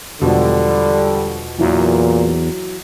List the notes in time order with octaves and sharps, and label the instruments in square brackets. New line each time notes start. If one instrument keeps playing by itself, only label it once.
[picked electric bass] E1 [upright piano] B2 F3 [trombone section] D3 G3
[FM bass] E2 [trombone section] A#2 [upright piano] E3 F#3